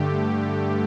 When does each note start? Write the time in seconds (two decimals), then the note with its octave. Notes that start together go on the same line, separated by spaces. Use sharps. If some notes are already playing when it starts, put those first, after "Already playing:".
Already playing: G2 D3 A3 G4